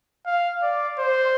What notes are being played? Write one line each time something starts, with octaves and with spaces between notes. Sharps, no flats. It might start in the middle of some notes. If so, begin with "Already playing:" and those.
F5
D5
C5